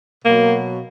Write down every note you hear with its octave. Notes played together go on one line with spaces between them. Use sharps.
B2 F#3 A#3